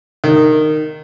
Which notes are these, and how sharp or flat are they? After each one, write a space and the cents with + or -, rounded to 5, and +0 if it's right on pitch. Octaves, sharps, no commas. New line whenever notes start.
D#3 -15